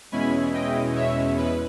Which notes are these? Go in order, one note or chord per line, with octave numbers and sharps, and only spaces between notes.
E2 B2 G#3 C#4 E4 G#5 B5
D#5 G5
C#5 E5
B4